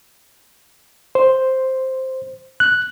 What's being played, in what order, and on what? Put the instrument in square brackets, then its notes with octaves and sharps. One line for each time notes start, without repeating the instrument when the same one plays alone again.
[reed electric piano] C5
F#6